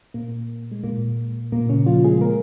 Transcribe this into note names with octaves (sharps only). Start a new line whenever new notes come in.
A#2 A#3
G#3
A#2 A#3
A#2 A#3
C#3 C#4
F3 F4
G#3 G#4
A#3 A#4